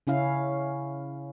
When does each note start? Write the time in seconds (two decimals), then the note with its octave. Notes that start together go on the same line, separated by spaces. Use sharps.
0.07 C#3 C#4 E4 F5